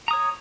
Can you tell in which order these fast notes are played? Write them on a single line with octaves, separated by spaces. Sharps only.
A#5 D#6 C#5